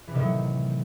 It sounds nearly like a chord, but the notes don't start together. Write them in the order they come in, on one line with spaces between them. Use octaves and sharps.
E3 C3 D#3 A2 F#3